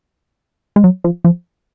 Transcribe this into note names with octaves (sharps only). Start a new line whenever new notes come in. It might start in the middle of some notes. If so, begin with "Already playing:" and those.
G#3
F#3
F3
F3